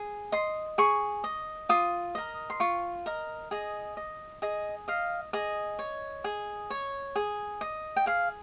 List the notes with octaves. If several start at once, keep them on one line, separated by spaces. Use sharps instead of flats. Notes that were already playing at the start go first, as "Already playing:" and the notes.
Already playing: G#4
D#5 C6
G#4 C#6
D#5
F4 D#6
A#4 D#5
C6
F4 C#6
A#4 D#5
G#4 D#5
D#5
G#4 D#5
D#5 F5
G#4 D#5
C#5
G#4
C#5
G#4
D#5
G5
G#4 F5